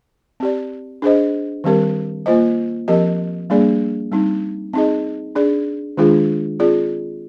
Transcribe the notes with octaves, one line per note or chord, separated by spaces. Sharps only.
C4 G4 D5
D4 G#4 C5 D#5
D#3 G3 C4 G4 A#4
A#3 F4 C5 D#5
F3 C4 G4 A#4 D#5
G3 A#3 D4 G#4 D5
G3 C4 D#4
C4 D#4 G#4 D#5
D4 G#4 D5
D#3 G#3 D4 F4 G#4
C4 F4 G#4 D5